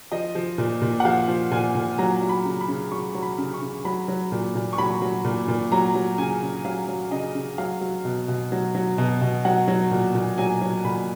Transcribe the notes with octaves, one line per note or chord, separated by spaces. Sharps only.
F3 D#5
F3
A#2
A#2
F#5
F3 F5
F3
A#2 G#5
A#2
F#3 A#5
F#3
B5
C#3
B5
C#3
F#3 C#6
F#3
B5
C#3
C#6
C#3
F#3 B5
F#3
A#2
A#2
C#6
F#3 B5
F#3
A#2
A#2
F#3 A#5
F#3
C#3 G#5
C#3
F#3 F5
F#3
C#3 D#5
C#3
F#3 F5
F#3
B2
B2
F#3
F#3
B2
B2
F#3 F#5
F#3
A#2
A#2
F#3 G#5
F#3
A#2 B5